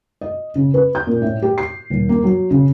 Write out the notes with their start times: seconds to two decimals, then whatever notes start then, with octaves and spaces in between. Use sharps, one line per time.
0.21 D#5
0.55 C#3
0.74 B4
0.95 G6
1.07 A#2
1.22 A2
1.42 G4
1.58 C7
1.90 D#1
2.09 A#3
2.24 F#3
2.51 C#3